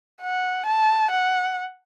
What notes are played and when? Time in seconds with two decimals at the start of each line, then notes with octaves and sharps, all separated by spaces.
0.22 F#5
0.66 A5
1.11 F#5